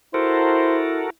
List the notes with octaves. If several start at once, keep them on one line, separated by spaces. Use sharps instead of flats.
E4 F#4 A4 A#4 C5